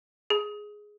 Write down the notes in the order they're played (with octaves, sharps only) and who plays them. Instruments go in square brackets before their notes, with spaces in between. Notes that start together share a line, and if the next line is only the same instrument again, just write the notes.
[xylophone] G#4